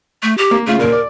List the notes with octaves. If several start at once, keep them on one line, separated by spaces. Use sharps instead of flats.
A3
G4
A#3
C#3 A3 F4
D#2 A#2 A#4
D5